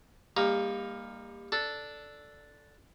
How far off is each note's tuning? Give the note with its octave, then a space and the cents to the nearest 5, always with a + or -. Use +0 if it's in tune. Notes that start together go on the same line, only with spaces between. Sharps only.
G3 +30 A#3 +0 D#4 +0
D4 +0 A4 +0